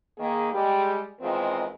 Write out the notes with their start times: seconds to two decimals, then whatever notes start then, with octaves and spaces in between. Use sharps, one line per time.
0.19 D#3 A#3 G#4
0.52 G3 G#3 G4
1.21 E2 D#3 G#3 C4 F4 A#4